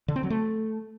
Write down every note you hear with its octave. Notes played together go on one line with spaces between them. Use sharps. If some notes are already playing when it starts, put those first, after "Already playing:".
D3
C4
F#3
A3